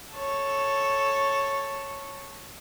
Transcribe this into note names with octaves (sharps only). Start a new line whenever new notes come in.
A4 C#5